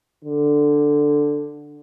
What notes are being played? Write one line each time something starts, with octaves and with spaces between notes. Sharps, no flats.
D3